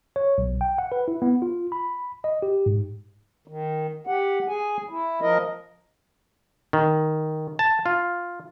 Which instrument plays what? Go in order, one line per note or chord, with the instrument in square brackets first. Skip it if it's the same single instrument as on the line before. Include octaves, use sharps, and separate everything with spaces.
[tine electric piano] C#5
B1
G5
F#5
B4
E4
B3
F4
B5
D#5
G4
G#2
[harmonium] D#3
G4 F#5
G#4 G#5
E4
F3 A#4 D#5
[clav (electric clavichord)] D#3
A5
F4